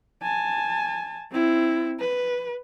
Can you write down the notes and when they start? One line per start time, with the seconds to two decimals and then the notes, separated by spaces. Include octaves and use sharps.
0.22 G#5 A5
1.31 C4 E4
2.00 B4